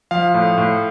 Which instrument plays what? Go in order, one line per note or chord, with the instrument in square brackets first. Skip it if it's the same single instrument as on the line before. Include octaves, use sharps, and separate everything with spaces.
[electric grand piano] F3 F5
A2
A2